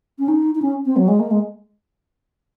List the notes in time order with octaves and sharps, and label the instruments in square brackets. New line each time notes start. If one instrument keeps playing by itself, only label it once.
[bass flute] C#4
D#4
D#4
C#4
C4
F#3
G#3
A#3
G#3